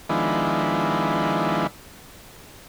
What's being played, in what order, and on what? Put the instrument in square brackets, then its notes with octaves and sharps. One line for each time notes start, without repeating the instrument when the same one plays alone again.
[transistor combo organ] D#3 F3 G#3 B3 D4 E4